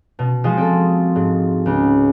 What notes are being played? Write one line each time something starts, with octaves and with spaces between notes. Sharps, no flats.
B2
F3 G#3 F4 F#4 D#5
C4 A4
G#2
C#2